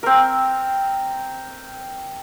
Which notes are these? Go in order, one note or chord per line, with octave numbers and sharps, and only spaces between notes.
C4 A#4